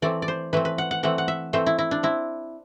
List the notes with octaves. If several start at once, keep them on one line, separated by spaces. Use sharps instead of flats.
E3 A3 C4 D5
D5
C5
E3 A3 C4 B4
B4
F#5
F#5
E3 A3 C4 F#5
F#5
E5
E3 A3 C4 C5
E4
E4
D4
C4 E4